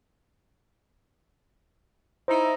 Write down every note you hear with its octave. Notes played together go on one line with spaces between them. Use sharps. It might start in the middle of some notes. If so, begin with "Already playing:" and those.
D#4 E4 C5